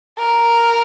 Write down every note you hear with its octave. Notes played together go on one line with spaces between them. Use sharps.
A#4